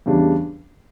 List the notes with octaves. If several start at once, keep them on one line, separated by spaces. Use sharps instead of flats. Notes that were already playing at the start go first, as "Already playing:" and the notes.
E2 C#3 G3 D4